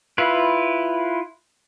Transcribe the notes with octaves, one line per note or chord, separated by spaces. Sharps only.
E4 F4 B4